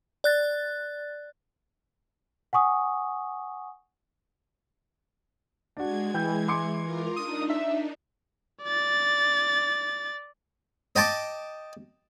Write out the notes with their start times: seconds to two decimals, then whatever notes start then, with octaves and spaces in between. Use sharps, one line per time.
0.24 D5 F#6 A6
2.53 F#5 G#5 C#6 D#6
5.77 G#3 D4 F#4 G#6
6.14 E3 G5 G6
6.48 C6 D6 C#7
6.83 F4 A#4
7.16 D4 D#4 D#6
7.50 E5
8.63 D5 A6
10.96 D#5 G5 A5 D6